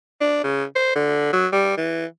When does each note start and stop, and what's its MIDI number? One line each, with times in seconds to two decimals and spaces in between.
0.21 0.43 62
0.44 0.64 49
0.76 0.94 72
0.96 1.33 50
1.33 1.47 54
1.53 1.76 55
1.78 2.06 52